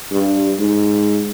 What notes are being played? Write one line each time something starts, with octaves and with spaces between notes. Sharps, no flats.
G2
G#2